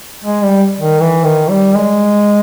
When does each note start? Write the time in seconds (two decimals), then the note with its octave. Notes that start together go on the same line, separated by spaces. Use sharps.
0.24 G#3
0.43 G3
0.80 D#3
1.00 E3
1.24 D#3
1.49 G3
1.75 G#3